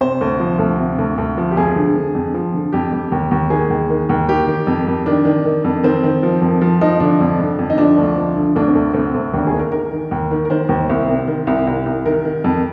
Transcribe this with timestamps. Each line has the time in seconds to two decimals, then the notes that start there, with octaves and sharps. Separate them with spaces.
0.01 C3 C5
0.21 D2
0.40 F3
0.59 D2
0.78 C3
0.98 D2
1.18 D2
1.38 F3
1.51 G4
1.56 F2 G#4
1.76 D3
1.95 D3
2.15 F2
2.34 F3
2.54 D3
2.72 F2 G4
2.92 F2
3.12 D#2
3.31 D#2
3.50 D#3 G#4
3.70 D#2
3.90 D#3
4.09 D#2
4.29 D#3 G4
4.47 D#3
4.67 F2
4.87 F2
5.06 D#3 D4
5.25 D#3
5.45 D#3
5.64 F2
5.83 D#3 C4
6.04 D#3
6.23 F3
6.42 F2
6.61 F3
6.81 F3 D#4
7.00 D3 D4
7.20 F2
7.39 D3
7.59 F2
7.70 D#4
7.78 F3 D4
7.98 D2
8.18 F3
8.36 D3
8.56 D2 D4
8.68 C4
8.75 D2
8.94 D2 C4
9.14 D2
9.34 D#2 D4
9.47 G#4
9.53 D#3
9.59 A#4
9.72 D#3 A#4
9.92 D#3
10.11 D#2
10.31 D#3
10.45 A#4
10.50 D#3 C5
10.69 D#2
10.89 C2
11.09 C3
11.27 D#3
11.47 C2
11.67 C2
11.86 C2
12.06 D#3 A#4
12.25 D#3
12.44 F2